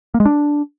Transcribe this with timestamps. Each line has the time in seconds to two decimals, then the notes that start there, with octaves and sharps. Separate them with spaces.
0.14 A#3
0.20 G#3
0.25 D4